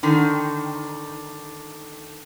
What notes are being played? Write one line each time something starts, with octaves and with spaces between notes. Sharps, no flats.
D3 D#3